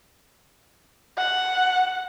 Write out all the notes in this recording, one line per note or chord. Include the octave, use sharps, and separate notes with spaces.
F#5